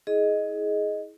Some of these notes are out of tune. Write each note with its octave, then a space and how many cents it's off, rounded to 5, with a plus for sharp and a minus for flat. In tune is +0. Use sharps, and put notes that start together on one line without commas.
E4 -35 G#4 +20 D#5 +0